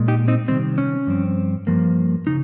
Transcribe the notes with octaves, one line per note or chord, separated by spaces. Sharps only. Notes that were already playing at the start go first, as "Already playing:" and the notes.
Already playing: A#2 G#3
D#4 G4
C4 D#4
C3 D#3 G3 C4
C#4
G2 F3 C4
G2 F3 A#3
C#3 D#4